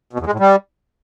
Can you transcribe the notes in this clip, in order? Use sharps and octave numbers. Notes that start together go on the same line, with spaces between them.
B2
E2
G#3
A2
G3